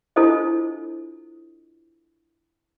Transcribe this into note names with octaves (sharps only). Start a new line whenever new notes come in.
D4 E4 F4 A4 C5 D#5